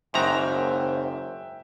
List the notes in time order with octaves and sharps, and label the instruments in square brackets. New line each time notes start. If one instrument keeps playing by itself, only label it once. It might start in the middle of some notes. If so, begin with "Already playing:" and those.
[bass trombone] F#1 [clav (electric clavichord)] G#2 D#3 A#5 [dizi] C5 [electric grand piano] E5 G5 F#6